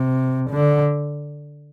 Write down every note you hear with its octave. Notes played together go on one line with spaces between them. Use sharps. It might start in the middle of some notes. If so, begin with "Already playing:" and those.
Already playing: C3
D3